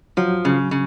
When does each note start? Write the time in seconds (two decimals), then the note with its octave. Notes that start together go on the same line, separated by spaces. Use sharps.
0.17 F3 F#3
0.45 C#3
0.71 C#3